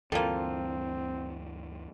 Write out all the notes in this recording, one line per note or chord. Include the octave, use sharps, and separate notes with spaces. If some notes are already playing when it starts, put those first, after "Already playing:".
D2 G2 E3 G3 A#3 C4 F4 A4